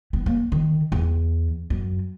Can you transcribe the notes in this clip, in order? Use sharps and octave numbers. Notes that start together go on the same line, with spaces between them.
B3
A#3
D#3
E2
F#2